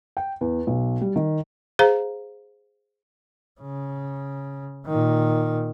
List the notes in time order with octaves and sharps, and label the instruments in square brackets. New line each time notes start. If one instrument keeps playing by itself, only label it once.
[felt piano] G5
E2
B1
G3
D#3
[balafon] G#4 C5 F5 A#5
[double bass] C#3
A#2 D#3